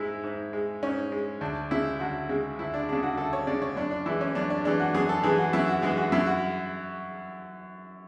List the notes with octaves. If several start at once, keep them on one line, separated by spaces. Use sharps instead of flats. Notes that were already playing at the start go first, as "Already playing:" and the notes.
Already playing: G#2 G#3 E4
G#2
G#3
G#2 C#4
G#3
D2 D4
C#3 G#3 E4
D2 F#4
C#3 G#3
D2 E4
D4
C#3 G#3 D4
F#4
D2 A4
C#5
C#3 G#3 D5
C#5
F#2 D4
D4
E3 G#3 E4
C#4
F#2 D4
D4
E3 G#3 D4
F#4
F#2 G#4
A4
E3 G#3 G#4
F#4
F#2 E4
F#4
E3 G#3 G#4
F#4
F#2 E4
F#4